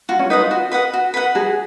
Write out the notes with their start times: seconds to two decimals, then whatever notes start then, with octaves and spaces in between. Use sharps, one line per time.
0.09 F4 F#4
0.19 C#4
0.30 D#4 B4 D#5 F#5
0.41 F4
0.51 F#4
0.72 B4 D#5 F#5
0.94 F#4
1.14 B4 D#5 F#5
1.35 F#4 G#4